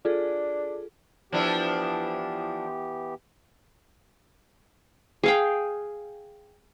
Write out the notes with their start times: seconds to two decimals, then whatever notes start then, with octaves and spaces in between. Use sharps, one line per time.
0.05 D4 F4 G#4 A4
1.32 E3 F3 B3 D4 E4 G4
5.23 G#4 F5 G5